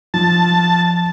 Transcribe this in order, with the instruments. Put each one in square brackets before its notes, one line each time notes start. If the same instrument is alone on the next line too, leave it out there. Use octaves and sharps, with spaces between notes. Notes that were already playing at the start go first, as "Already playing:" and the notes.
[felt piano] F3 [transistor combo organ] A5